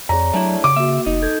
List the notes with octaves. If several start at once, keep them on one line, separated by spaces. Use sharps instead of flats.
F2 G#4 C#5 D5 A#5
F#3 A3 D4 E4
C#3 D6
A#3 F#4 E5
F1 D#4 D#5
A4 G6 G#6